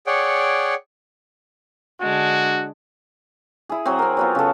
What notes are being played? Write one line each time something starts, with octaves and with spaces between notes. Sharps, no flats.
G#4 C#5 D5 F#5 G5
D3 G#3 D4 F#4
E4 G#4
F#3 C4
C4 A#4
F#3 B3 F4
C#3 A4